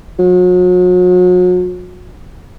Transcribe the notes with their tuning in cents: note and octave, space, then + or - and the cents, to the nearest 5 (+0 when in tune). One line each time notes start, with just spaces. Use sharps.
F#3 -40